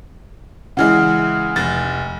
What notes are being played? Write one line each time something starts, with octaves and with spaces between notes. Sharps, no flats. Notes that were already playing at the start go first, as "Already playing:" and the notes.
C#3 E3 G#3 F#5 F6
F1 A6